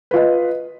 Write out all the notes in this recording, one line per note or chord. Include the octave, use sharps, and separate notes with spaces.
F4 B4 D#5